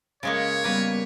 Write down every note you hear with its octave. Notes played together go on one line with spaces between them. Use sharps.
C#3 G#3 A#3 C#5
G3 A#3 B3 B4